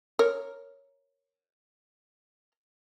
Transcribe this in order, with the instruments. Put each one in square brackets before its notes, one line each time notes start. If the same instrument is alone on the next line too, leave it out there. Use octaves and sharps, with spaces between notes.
[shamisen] A#4 C#5